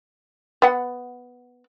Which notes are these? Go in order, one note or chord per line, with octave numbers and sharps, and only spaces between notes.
B3 F#5